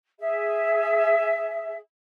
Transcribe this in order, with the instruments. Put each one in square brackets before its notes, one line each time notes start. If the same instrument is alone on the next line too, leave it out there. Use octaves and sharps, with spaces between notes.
[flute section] G#4 E5